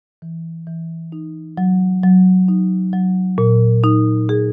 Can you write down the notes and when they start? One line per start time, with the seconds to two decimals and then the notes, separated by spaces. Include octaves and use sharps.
0.22 E3
0.67 E3
1.12 D#4
1.58 F#3
2.03 F#3
2.48 D#4
2.93 F#3
3.38 A#2
3.84 D#4
4.29 G#4